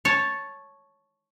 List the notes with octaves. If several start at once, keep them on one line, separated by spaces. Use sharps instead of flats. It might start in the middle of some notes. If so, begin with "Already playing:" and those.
C#5 A5